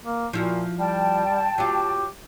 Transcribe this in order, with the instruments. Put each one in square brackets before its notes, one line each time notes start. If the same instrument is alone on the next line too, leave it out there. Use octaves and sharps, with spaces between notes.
[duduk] A#3
[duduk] A#2 [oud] F3 E4 F#4
[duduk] G3 [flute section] G5 A5
[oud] F#3 F4 [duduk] G4